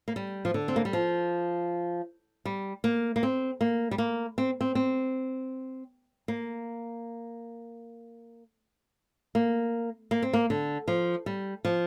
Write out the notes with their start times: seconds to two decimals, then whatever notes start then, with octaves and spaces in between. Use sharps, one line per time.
0.08 A#3
0.16 G3
0.45 F3
0.54 D3
0.68 C4
0.76 A#3
0.85 G3
0.93 F3
2.45 G3
2.84 A#3
3.16 A#3
3.23 C4
3.61 A#3
3.91 G3
3.98 A#3
4.38 C4
4.61 C4
4.75 C4
6.28 A#3
9.35 A#3
10.11 A#3
10.22 C4
10.33 A#3
10.50 D3
10.88 F3
11.26 G3
11.65 F3